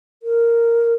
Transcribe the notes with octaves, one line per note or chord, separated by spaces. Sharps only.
A#4